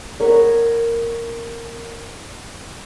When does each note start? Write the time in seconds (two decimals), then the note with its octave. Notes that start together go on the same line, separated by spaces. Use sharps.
0.20 B3 A#4 C#5